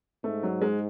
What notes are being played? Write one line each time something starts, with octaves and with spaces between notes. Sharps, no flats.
G#2 A3
F#3
G#3